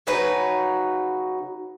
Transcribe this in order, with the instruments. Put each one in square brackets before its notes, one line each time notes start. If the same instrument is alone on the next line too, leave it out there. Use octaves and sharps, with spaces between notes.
[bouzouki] C#3 F#3 D#4 B4